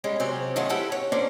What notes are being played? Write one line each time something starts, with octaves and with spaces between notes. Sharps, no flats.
G3 G#3 C#4
C3 F#3 C4 C#4 G4 G#4
D#3 F#3 A3 C#4 F4
E4 G4 A4 B4 E5 F#5
C#5
A#3 C#4 D4 C5 D5